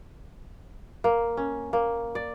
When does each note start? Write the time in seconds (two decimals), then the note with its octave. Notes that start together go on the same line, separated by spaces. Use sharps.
1.04 A#3
1.37 C#4
1.73 A#3
2.15 D5